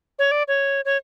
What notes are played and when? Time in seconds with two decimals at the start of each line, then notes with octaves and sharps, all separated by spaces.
0.19 C#5
0.31 D5
0.48 C#5
0.85 C#5